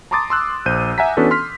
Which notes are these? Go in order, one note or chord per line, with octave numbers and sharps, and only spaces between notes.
A5 A#5 C6 D6 D#6 A6
C6 E6 F#6
A#1 C5 G6 D#7
E5 F#5 G#5 A#5 B6
E3 B3 C#4 D4 F#4 A4
C6 F6 B6